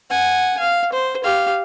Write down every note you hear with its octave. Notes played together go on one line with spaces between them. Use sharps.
F#5 G#5
F5
C5
G4 F5